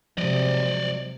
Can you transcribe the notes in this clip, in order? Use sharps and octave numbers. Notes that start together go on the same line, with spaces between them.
C3 F3 F#3 G#3 D5 D#5